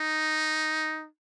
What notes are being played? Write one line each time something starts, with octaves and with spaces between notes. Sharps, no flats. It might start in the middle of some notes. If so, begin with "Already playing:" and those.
Already playing: D#4